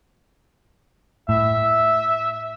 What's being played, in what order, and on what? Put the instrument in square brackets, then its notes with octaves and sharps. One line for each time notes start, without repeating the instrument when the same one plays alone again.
[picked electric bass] A2 [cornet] E5